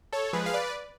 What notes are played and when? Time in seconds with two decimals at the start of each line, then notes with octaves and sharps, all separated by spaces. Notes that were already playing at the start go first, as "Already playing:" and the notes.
0.13 A4 C#5
0.33 F3 G#3 G#4 B4
0.46 F5
0.53 B4 D5